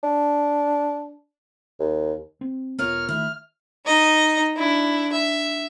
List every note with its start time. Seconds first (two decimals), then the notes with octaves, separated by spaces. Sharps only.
0.03 D4
1.80 D#2
2.41 C4
2.79 E1 C2 B3 F4 A#4 C#5 F6
3.09 D#3 A3 E4 F6
3.86 D#4 D#5
4.57 D4 E4
5.13 E5